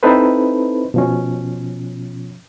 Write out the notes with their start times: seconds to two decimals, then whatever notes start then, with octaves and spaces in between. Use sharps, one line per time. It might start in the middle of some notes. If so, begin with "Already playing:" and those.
0.03 C4 D#4 E4 A4 B4 C5
0.94 B2 F3 C#4